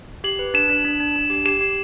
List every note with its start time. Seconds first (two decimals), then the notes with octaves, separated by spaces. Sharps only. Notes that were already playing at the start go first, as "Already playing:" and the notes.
0.24 G4 F#7
0.39 B4
0.54 D4 E7
0.69 D4
0.85 D4
1.00 D4
1.16 D4
1.30 G4
1.46 G4 E7
1.61 G4